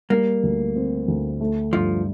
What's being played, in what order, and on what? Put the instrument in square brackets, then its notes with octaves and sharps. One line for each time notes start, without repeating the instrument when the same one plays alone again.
[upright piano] G3 [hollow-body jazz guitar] A#3
[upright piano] D2
C4
D2
A3
[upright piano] G2 [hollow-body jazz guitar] F3